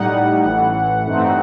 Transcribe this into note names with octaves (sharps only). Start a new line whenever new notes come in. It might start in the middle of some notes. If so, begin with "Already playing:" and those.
Already playing: A2 G3 D#4 F#5
A1 A2 E3
G2 E3 A3 C4 D#4